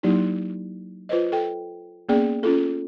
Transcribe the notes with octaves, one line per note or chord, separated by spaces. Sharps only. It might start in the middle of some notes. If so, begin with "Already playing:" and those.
F#3 A#3 D#4 E4 G4
F4 B4 C5 D#5
A4 G5
A#3 B3 C#4 G#4 D5 G5
C#4 F4 A4